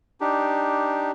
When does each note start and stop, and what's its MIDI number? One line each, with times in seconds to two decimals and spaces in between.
0.21 1.11 62
0.21 1.11 63
0.21 1.11 67